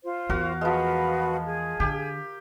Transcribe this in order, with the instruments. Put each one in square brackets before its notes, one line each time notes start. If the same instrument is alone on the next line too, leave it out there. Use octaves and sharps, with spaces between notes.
[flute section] F4 C5
[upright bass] E2 [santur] F#4 A#4 F5
[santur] F3 G#3 [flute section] F#4 B4 F5
[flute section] G#4
[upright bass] D3 [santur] G4